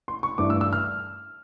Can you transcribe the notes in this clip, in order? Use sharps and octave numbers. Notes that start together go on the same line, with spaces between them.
C6
C#6
G2 E3 A3 D4 D6
E6
E6
F6